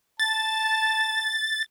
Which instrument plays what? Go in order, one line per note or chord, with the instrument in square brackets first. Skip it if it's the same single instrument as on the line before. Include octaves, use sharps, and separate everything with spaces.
[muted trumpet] A5 [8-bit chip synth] A6